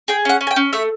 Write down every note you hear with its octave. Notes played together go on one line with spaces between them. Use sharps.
G#4 G5
C#4 F#5
C#4
G#5
G5
C#4
A3 E5